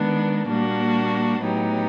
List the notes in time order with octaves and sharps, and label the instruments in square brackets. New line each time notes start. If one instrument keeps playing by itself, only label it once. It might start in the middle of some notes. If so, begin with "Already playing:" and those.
Already playing: [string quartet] D#3 G#3 B3 D4
A#2 G3 A#3 D4 F#4
A2 F#3 B3 D#4 G4